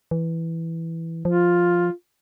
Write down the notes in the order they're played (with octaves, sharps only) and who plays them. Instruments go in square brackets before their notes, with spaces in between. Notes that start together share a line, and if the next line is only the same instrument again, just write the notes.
[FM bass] E3
[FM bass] F3 [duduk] F4